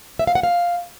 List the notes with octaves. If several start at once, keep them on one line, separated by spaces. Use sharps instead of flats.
E5
F5
F#5
F5